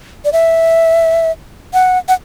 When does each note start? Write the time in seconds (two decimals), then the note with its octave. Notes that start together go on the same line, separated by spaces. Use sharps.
0.25 D5
0.33 E5
1.74 F#5
2.08 F#5